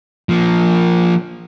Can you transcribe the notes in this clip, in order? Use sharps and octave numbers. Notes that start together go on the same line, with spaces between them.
F3 A#3